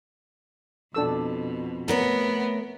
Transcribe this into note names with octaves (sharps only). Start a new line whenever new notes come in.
F2 B2 D4 A4 E6
A3 B3 A#4 C#5